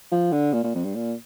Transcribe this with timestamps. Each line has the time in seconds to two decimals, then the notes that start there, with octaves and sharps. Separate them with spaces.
0.12 F3
0.32 D3
0.53 A#2
0.64 A#2
0.75 F2
0.85 G2
0.95 A#2